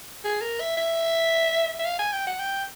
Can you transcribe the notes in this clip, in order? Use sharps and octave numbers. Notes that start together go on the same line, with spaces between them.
G#4
A#4
E5
E5
E5
F5
G#5
G5
F#5
G5